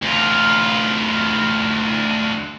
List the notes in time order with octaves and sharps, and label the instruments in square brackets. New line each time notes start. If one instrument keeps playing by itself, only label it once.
[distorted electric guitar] D2 F4